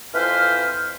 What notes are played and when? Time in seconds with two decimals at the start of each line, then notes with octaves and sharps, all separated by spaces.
0.14 F2 E3 B4 C5 F5 F6